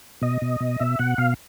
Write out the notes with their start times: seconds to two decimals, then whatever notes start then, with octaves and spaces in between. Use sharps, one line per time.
0.21 B2 D#5
0.42 B2
0.60 B2
0.80 B2 E5
0.99 B2 F#5
1.18 B2 F5